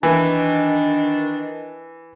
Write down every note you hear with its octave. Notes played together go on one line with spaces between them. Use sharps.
D#3 E3 D4